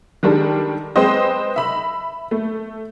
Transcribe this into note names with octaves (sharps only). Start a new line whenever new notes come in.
D#3 G3 G#3 D4 A4
G#3 C4 B4 C5 D#5
E5 B5
A3